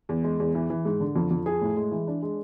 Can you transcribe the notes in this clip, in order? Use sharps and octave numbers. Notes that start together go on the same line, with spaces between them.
E2
G#3
E2
E3
E3
G#2
D3
F2
F2
G#4
A2
G#3
E3
D4
G#3